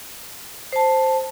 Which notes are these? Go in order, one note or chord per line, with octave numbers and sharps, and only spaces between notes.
C5 A5